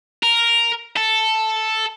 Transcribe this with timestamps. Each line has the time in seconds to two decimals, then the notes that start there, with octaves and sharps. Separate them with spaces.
0.23 A#4
0.97 A4